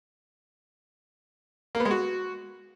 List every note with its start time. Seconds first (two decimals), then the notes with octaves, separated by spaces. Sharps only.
1.75 A#3
1.80 B3
1.85 G#3
1.91 F#4